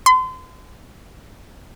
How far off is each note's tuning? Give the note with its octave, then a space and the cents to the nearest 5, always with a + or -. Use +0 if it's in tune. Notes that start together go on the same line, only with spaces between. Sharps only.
C6 -35